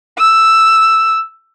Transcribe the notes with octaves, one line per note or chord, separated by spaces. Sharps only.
E6